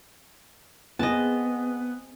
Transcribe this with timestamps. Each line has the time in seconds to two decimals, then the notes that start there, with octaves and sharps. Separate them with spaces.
0.99 B3 C4 G#4 D#5 A5